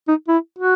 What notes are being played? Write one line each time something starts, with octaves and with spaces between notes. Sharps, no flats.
D#4
E4
F#4